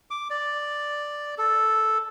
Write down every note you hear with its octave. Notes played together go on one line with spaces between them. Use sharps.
D6
D5
A4